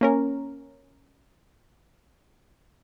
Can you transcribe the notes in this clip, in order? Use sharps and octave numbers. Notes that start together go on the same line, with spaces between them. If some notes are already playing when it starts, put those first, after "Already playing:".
A#3 C#4 A#4